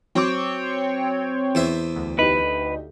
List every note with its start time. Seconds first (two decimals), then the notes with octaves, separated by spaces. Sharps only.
0.15 F#3 C4 C#5 G5 D6
1.55 E2 C5 E5
1.96 D2
2.19 D#4 G4 B4